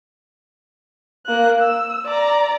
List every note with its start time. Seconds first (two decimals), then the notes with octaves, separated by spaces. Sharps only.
1.26 A#3 F#6
1.61 E6
2.06 D5 A#5